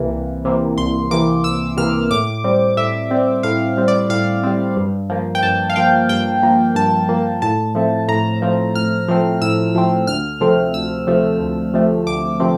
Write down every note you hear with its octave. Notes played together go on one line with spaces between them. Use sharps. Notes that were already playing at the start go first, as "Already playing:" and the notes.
Already playing: C2 C3 E3 A#3
C2
C3 E3 A#3
C2 C6
C3 E3 A#3 D6
C2 E6
C3 E3 A#3 F6
A2 D6
G3 C4
A2 E5
G3 C4
A2 F5
G3 C4
D5
A2 F5
G3 C4
G2
F3 A#3
G5
G2 A5
F5
F3 A#3 G5
G2 G5
F3 A#3
G2 A5
F3 A#3
A2 A5
F3 A3 C4
A2 A#5
F3 A3 C4
A2 F6
F3 A3 C4
A2 E6
F3 A3 C4
D2 F6
C3 F3 A3 C4
D2 E6
C3 F3 A3 C4
D2
C3 F3 A3 C4
D2 D6
C3 F3 A3 C4